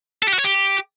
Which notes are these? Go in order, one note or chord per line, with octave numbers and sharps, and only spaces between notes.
A4
G4
F#4
C#5
G4